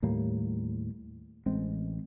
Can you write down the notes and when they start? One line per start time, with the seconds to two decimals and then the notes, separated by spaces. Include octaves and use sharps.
0.02 D#2 A2 G3 A#3
1.46 A1 G#3 C4